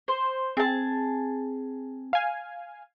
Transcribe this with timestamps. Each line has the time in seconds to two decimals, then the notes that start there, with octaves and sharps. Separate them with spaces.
0.08 C5
0.57 C4 G#4 A5
2.13 F5 G#5